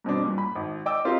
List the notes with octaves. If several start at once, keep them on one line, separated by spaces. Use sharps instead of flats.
G2 B2 C4 D4
G2 A#2
B5
G#1
D5 D#5 G5 D6 E6
C4 F4 G4 A#4 C5 D#5